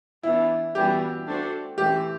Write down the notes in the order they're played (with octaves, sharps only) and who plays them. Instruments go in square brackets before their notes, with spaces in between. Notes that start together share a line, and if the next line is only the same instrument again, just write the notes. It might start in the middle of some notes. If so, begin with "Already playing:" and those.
[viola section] E3 B3 D4 [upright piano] E4
[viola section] E3 G3 B3 D4 F#4 [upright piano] G4
[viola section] A3 D4 F#4 A4 C5
[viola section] E3 A3 C4 [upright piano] G4